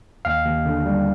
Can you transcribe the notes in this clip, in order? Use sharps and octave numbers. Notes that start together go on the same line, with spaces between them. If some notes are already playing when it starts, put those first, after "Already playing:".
D#2 F5
D#2
D3
G3